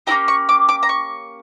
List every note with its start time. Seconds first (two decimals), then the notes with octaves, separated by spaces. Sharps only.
0.07 A#3 C#4 E4 G4 A#5
0.28 C#6
0.49 D6
0.69 D6
0.83 A#5
0.89 C#6